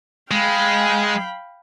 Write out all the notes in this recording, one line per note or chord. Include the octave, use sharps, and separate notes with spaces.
G#3 F5 G5 B5